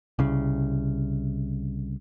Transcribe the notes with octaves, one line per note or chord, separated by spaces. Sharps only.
C2 C#3